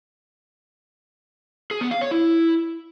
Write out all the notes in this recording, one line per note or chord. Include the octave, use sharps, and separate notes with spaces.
G#4
B3
F5
C#5
E4